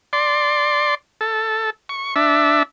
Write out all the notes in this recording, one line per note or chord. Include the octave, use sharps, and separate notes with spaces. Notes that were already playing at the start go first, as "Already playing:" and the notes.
D5 C6
A4
C#6
D4 E5